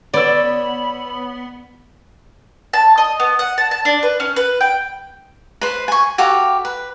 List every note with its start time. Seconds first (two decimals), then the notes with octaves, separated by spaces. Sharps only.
0.14 B3 C#5 D5 B5 E6
2.73 A5
2.98 D#5
3.20 B3
3.39 F#5
3.58 A5
3.71 A5
3.85 D4
4.03 B4
4.20 C#4
4.36 B4
4.61 G5
5.61 B4 C5
5.88 G#5 C#6
6.18 F#4 G4 A4 F5
6.65 B4